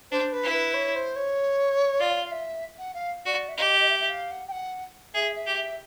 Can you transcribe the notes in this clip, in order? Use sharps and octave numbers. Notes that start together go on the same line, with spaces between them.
D4 C5
B4
E4
B4
C#5
C5
C#5
F4 D5
F5
E5
F#5
F5
F#4 D5
E5
G4 D#5
D#5
E5
E5
F5
F#5
G5
F#5
G#4 E5
E5
G4
E5